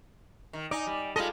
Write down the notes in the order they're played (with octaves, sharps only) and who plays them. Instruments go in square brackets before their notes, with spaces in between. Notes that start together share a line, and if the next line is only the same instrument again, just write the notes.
[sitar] D#3
[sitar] D#4 [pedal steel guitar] D5 G#5
[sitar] G3
[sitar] G3 G#3 D#5 [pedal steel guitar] F4 A4